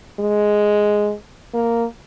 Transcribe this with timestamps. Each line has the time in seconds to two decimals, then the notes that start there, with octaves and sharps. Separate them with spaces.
0.19 G#3
1.53 A#3